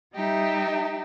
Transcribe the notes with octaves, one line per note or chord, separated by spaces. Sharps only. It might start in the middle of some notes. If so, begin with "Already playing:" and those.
G3 D#4 G4 E5